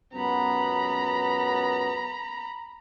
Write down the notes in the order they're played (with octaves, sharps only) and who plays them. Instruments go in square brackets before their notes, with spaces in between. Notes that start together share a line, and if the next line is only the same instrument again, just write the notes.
[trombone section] C#2 F#2 B3 [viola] A#5 B5